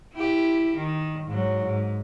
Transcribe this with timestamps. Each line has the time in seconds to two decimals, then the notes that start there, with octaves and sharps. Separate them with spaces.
0.14 E4 G4
0.77 D#3
1.27 G#2 F#3
1.65 G#2